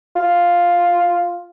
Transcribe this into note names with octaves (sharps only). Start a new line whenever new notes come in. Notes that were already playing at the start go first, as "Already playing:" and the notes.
F4